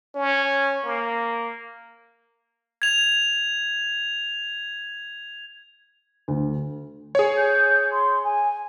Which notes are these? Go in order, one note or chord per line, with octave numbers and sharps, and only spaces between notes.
C#4
A#3
G#6 F7
D2
G#4 C#5
G6
C6
G#5